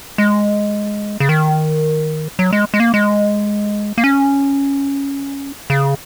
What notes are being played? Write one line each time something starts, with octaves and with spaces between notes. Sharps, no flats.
G#3
C#3
D#3
F#3
G#3
G#3
A#3
G#3
A#3
C#4
C#3